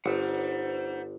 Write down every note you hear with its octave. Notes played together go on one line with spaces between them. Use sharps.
G1 C5 F#5